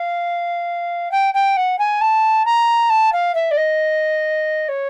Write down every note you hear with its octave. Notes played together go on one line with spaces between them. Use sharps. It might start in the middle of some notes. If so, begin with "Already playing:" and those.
Already playing: F5
G5
G5
F#5
G#5
A5
A#5
A5
F5
E5
D5
D#5
C#5